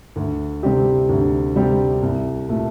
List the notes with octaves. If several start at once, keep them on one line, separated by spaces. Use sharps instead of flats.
D2
C3 G3 C4 G4
D2
C3 G3 C4 G4
C2
A#2 A3